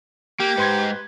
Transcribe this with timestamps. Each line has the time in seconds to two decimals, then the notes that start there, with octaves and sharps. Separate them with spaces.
0.40 A#3 G4
0.58 G#2 B4 C6 G#6